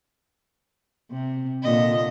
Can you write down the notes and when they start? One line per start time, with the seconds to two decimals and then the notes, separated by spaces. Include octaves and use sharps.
1.11 C3
1.63 A#2 D3 D#5